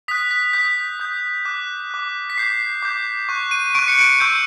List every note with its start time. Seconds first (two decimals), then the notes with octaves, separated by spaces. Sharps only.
0.08 D#6 B6
0.11 F#6
0.31 B6
0.53 D#6 G6 B6
1.00 D#6 G6
1.45 D6 F#6
1.91 D6 F#6
2.30 B6
2.38 D6 G6 C7
2.82 D6 G6
3.29 C#6 F#6
3.51 D#7
3.75 C#6 F#6 D7
3.88 C#7
4.01 D7
4.20 C#6 E6 G6